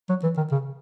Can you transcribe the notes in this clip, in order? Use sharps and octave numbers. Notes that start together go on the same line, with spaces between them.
F#3
E3
D#3
C#3